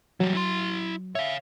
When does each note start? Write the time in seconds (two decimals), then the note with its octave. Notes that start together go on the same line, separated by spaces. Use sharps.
0.20 E3 F#3 G3
0.35 E4 C6
1.15 C#5 E5 F5